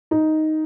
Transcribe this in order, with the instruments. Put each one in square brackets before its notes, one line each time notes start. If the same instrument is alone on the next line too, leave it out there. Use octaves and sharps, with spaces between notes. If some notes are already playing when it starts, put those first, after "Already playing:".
[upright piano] D#4